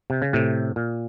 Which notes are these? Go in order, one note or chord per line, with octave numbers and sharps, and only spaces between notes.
C3
C#3
A2 C3
A#2